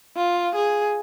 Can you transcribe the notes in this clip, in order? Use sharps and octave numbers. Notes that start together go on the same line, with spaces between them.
F4
G#4